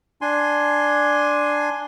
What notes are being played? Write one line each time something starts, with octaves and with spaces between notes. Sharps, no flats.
D4 G#5 C6